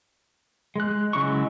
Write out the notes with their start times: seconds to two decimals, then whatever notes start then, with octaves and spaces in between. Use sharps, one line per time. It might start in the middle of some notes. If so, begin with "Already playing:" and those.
0.76 G#3 F#6
1.13 C#3 F#3 G#3 E4 C#6